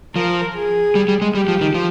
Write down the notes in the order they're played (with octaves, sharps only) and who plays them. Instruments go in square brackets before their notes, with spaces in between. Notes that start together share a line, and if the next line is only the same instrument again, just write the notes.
[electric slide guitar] F3 [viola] A#4
[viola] G#4
[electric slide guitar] G3
G3
G#3
[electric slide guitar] G3 [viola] G4
[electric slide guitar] F3
D#3
F3